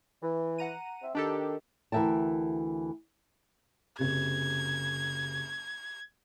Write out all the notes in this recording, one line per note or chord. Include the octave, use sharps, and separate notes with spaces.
E3
F#5 A#5 D#7
C4 E5
D#3 D4 G4 A4
D2 E3 A#4 E5 G5 A5
F#1 C3 G#6